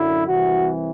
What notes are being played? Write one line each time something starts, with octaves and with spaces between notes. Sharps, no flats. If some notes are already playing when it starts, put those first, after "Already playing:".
Already playing: F#2 D3 F#3 E4
C2 C3 E3 F#4